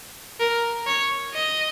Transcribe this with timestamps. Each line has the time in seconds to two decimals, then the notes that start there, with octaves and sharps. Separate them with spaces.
0.40 A#4
0.87 C#5
1.34 D#5